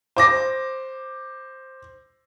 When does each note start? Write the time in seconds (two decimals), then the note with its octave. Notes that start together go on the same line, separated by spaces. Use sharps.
0.17 C5 D6 A#6